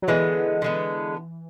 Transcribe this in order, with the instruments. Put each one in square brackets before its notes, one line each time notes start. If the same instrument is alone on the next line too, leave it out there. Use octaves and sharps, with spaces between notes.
[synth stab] F#3
[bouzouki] D3 G#3 B3 [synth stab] E3
[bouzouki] D3 G#3 B3